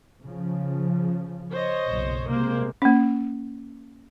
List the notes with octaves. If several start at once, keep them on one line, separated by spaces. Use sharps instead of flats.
C#3 F3
C5 C#5 D#5
F#1 B1
C3 G#3 A#3 C5
A#3 C#4